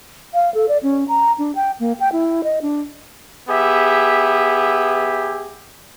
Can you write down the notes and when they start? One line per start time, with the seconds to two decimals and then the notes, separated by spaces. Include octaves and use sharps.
0.34 F5
0.54 A4
0.69 D5
0.83 C#4
1.08 A#5
1.38 D4
1.55 G5
1.80 A#3
2.00 G5
2.13 E4
2.44 D#5
2.62 D4
3.49 B3 G4 G#4 E5